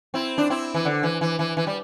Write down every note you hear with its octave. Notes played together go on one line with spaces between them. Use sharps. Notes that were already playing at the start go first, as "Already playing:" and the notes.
C4 E4
D4
C4 E4
E3
D3
E3
E3
E3
E3
G3